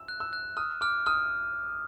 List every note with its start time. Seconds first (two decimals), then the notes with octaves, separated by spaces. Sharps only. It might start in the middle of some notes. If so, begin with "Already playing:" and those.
Already playing: E6
0.08 F#6
0.20 E6
0.33 F#6
0.57 D#6 F6
0.81 D6 F6
1.06 D#6 F6